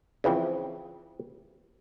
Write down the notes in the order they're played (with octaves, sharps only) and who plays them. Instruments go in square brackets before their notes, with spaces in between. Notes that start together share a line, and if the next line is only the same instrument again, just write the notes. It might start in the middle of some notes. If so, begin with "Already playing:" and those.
[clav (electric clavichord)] C#3 E3 F3 C4